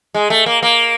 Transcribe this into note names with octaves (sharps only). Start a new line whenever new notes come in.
G#3
A3
A#3
A#3